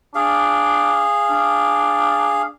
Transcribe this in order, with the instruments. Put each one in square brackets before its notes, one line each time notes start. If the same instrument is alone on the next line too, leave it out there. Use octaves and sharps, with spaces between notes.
[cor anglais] D4 [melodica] G#4 F5
[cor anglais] D4